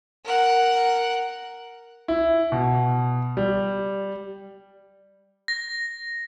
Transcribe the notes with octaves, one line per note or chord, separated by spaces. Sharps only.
A#4 F#5
E4
B2
G3
A#6